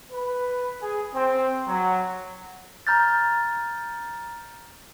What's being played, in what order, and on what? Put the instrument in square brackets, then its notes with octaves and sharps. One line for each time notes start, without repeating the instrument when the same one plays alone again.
[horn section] B4
G#4
C4
F#3
[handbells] A#5 F6 G6 A6